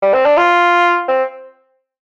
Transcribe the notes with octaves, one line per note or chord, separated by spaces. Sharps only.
G3
C4
D4
F4
C4